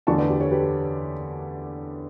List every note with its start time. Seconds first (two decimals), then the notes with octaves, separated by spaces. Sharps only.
0.07 E2 D3 A3 D4 A5 C#6
0.18 B4 D5
0.29 G4
0.41 A4 C#5
0.51 G4 B4